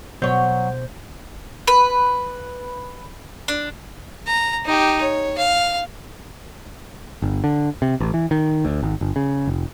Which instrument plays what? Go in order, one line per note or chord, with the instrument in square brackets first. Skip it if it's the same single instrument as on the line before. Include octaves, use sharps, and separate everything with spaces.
[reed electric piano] B2 C5 G6 [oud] F#3 C#5
[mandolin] B4
D4
[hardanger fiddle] A#5
D#4 G4
C#5
F5
[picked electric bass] G1
D3
C3
A1
E3
D#3
D2
G#1
G1
C#3
F1